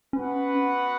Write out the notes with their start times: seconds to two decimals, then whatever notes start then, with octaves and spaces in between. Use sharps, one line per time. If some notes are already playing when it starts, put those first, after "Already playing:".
0.13 B3 C#4 F#4 B4 F#5